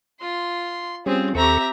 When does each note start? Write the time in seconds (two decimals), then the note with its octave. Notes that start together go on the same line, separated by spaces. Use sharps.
0.21 F4 C6
1.06 G3 C4 C#4 F4 G#4
1.35 D#2 C4 G4 A4 E5 A#5 C#6